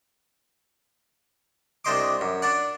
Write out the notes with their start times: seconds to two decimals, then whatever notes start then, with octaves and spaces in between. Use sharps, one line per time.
1.85 C2 D4 C5 D#5 C6 D6
2.21 F#2
2.42 D4 D5 F#5